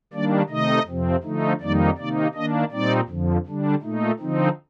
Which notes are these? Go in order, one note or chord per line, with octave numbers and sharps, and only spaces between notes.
D#3 G3 A#3 D4 D5
C3 D#3 A3 D#4 D#5
F2 C3 F3 C4
D3 F3 A3 D#4
F2 D#3 G3 A#3 D#4 D5
C3 D#3 A#3 D#4 D5
D#3 A#3 D4 D#5
A#2 G3 C4 D#4 D5
F2 D3 F3
D3 G3 D4
A#2 A3 D#4
D3 F3 C4 D#4